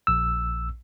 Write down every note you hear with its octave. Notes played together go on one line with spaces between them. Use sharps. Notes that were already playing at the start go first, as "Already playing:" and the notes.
A#1 E6